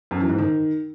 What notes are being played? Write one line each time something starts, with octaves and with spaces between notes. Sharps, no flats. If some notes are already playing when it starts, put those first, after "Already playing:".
F#2
E3
G#2
D#3